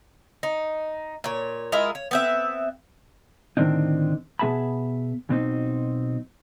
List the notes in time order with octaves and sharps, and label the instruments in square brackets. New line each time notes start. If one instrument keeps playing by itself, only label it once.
[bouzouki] D#4
A#2 C#5
G#3 E4 F4 A#4
C#5
B3 C4 E5
[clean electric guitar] A2 D3 D#3 C4 D4 D#4
B2 B3 G#4 E5 A5 B5
B1 B2 C4 D#4